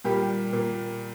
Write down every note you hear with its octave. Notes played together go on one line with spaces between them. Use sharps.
A#2 G3 A#3 G4
A#2 A#3